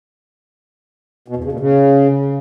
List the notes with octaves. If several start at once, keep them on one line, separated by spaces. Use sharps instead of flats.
B2
E2
C#3
A#2
C#3